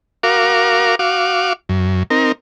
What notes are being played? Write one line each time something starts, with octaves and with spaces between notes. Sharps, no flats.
F#4 A#4 F5 D6
F#4 F5 D6
F#2
C4 D#4 A#4